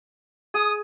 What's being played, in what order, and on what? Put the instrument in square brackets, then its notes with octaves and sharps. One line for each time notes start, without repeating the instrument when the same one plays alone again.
[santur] G#4 [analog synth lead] D#6